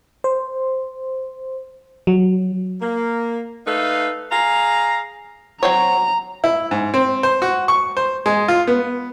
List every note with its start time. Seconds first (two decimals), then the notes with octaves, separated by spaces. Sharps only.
0.24 C5
2.07 F#3
2.81 A#3
3.66 A3 D#4 A4 B4 F5
4.31 G#4 F5 A#5
5.63 F#3 C4 C#5 A#5
6.44 E4
6.71 G#2
6.94 C4
7.23 C5
7.42 F#4
7.68 C#6
7.97 C5
8.26 G#3
8.48 F4
8.67 B3